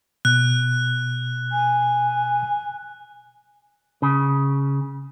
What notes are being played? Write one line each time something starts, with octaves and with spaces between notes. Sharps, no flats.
B2 F#6
G#5
C#3